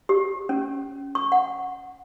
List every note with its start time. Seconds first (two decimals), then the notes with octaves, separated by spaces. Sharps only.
0.09 G4
0.49 C#4
1.15 C#6
1.32 F#5